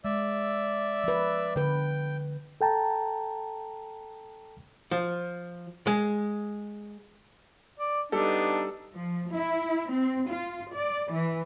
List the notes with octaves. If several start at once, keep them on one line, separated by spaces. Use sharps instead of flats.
G#3 D5 E5 E6
F3 B4
D3 B4 G5
A4 G5 A5 A#5
F3
G#3
D5
G3 B3 D4 D#4 A4
F3
E4
C4
F4
D5
E3